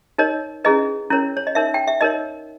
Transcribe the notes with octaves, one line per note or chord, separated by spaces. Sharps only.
D#4 A#4 C#5 D#5
C#4 E4 G#4 B4 D#5
C#4 E4 A#4 C#5
C#5
D#5
D#4 A#4 C#5 E5
G5
E5
D#4 A#4 C#5 D#5